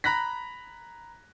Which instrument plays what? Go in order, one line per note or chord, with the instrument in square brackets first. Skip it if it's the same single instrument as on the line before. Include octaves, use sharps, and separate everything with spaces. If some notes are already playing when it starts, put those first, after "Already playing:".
[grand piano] A#5 B5 F#6 A#6 B6